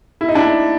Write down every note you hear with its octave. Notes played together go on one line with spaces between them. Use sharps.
E4
D#4
D4 E4